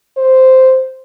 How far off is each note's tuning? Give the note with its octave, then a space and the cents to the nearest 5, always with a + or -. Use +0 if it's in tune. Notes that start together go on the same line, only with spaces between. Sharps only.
C5 -5